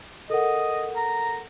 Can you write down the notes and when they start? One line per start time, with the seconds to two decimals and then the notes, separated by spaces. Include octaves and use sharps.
0.30 A4 A#4 D#5 F#5
0.97 A#5